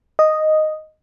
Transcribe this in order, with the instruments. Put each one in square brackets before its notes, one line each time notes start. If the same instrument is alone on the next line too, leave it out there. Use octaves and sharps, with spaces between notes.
[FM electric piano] D#5